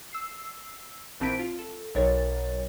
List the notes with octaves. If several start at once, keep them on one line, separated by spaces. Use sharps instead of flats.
E6 C7
A#1 E3 C4 A5 B6 D7
F4
A4
B1 F#3 A#4 C#5 A6